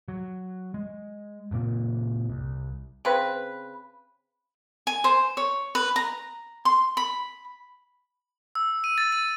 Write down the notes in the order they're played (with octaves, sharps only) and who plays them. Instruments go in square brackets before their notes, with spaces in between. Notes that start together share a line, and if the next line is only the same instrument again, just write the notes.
[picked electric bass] F#3
G#3
F#1 A#2 A#3
C2
[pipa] C#3 C4 B4
[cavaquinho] G#5
C5
C#5
B4
A#5
C6
B5
[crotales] E6
D#7
A6
D#7